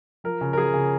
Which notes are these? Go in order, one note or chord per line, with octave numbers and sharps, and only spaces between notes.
F3 A#4
C#3
A#4
F3 G#4
C#3